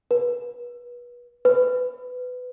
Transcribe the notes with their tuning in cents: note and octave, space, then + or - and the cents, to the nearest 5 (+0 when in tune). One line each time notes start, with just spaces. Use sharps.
B4 -30
B4 +20